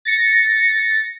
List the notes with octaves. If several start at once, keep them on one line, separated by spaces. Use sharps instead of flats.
A6 A#6 C#7